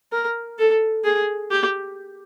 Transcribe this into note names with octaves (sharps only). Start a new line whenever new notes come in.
A#4
A4
G#4
G4